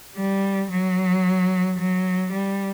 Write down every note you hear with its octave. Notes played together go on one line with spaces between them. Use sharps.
G3
F#3
F#3
G3